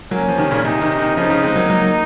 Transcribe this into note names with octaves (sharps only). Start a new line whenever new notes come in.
F#3 A#3 C#4
F3
C3 D#3
A#2 C#3
C3 D#4
C3 D#3
C3 D#3
C#3 F3 D#4
C#3 F3
G#3 C4
F#3 A#3
F#3 A#3